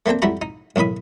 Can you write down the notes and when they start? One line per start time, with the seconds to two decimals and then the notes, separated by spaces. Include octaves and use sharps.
0.06 A3 A#3 C4 D4 G5
0.22 F2 G3 E4 F#4 A#5
0.42 D#4
0.76 B1 A2 D#3 B5 D#6